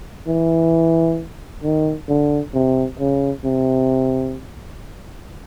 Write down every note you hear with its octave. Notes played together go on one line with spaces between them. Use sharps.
E3
D#3
D3
C3
C#3
C3